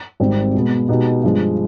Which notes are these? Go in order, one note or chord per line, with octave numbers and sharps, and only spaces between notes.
G#1 G#2 G3 C4
B2 G#3 B3
B2 G#3 B3 D#4 G4
G2 F3 G#3